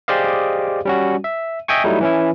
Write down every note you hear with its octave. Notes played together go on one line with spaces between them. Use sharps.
G4 G#4 C5 D5 D#5 F5
G3 C#4 F#4
E5
D#5 E5 G5 G#5 C#6
F#3 G3 A3 D#4 E4
E3 C#4 E4